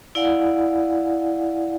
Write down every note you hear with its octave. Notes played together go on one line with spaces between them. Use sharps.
E4 D5 F5 F#5 G#5